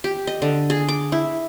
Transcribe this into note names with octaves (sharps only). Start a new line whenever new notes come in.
G4
D#5
D3
G#4
D6
E4